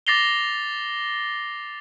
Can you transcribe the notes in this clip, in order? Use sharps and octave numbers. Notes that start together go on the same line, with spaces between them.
D6 A6 A#6 C7 F7 G7